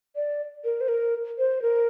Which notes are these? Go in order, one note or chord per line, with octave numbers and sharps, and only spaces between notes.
D5
A#4
C5
A#4
C5
A#4